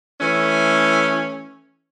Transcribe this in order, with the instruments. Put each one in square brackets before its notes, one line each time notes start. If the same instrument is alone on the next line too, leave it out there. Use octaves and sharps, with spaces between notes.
[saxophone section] E3 A3 C#4